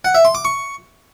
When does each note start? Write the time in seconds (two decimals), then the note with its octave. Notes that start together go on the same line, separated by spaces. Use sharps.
0.05 F#5
0.15 E5
0.25 C6
0.35 D6
0.45 C#6